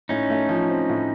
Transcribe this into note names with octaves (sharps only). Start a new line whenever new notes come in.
A2 C#4 D#4
A3
F3
C4
A2